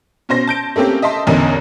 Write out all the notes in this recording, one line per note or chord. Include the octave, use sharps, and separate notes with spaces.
B2 C#4 C5 A#6
A5 G6 D7
A3 A#3 C4 C#4 G4
D#5 E5 A5 C6
A1 E2 D3 C#4 A#4 D#5